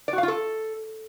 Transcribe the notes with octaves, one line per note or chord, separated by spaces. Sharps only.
D5
F#4
F5
F4
A4